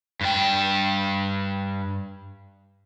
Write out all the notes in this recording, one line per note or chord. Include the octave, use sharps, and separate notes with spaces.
G2 G5